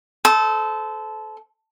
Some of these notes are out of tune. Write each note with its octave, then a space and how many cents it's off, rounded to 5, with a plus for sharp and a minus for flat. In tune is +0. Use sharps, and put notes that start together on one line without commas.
A4 -20 C5 -25 D#6 +30